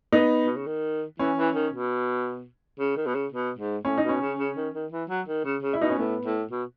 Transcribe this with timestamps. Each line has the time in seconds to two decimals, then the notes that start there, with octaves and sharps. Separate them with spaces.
0.12 B3 D#4
0.46 B2
0.56 C#3
0.66 D#3
1.19 E3 C#4
1.37 E3
1.55 D#3
1.73 B2
2.79 C#3
2.96 D#3
3.06 B2
3.14 C#3
3.32 B2
3.58 G#2
3.85 A2 C#4
3.98 D#4
4.03 B2
4.09 C#4
4.21 C#3
4.38 C#3
4.56 D#3
4.74 D#3
4.92 E3
5.09 F#3
5.27 D#3
5.44 C#3
5.62 C#3
5.73 E4
5.80 B2 D#4
5.90 C#4
5.98 A2 B3
6.25 A2
6.51 B2